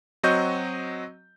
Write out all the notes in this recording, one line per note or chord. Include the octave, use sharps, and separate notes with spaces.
F#3 C4 F#4 D#5 C#6 G6